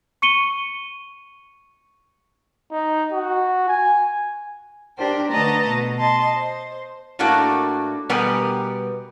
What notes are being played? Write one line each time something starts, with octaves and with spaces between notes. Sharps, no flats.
C#6 C#7 D#7 G7
D#4
F#4
G#5
D4 G4 A#4 C5 G5
D3 A3 B4 D#5 A5 A#5
B2
D#5 A5 C6
C5
A2 A3 A#3 D4 F#4
B2 G3 B3 G4 A#4 G#5